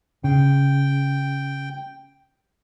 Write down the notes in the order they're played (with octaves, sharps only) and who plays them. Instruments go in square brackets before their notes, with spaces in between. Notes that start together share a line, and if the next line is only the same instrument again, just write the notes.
[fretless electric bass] C#3 [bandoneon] G5